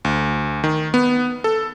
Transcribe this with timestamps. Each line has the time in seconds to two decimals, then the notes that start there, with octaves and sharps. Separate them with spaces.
0.05 D2
0.64 D#3
0.94 B3
1.44 A4